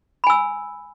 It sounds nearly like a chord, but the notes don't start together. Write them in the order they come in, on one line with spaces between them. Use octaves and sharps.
B5 G#5 E6